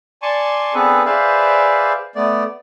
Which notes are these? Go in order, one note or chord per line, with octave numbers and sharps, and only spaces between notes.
D5 G#5 A5 C6 C#6
B3 C4 D4 G#4 A4 B4
G#4 B4 C5 D5 E5 F5
A3 B3 D5